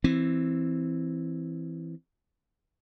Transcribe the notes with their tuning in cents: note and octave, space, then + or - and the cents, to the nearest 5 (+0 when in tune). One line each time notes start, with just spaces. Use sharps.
E3 +0 C4 +0